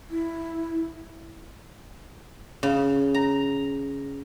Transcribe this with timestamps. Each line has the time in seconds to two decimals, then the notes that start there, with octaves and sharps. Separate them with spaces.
0.10 E4
2.63 C#3
3.14 A#5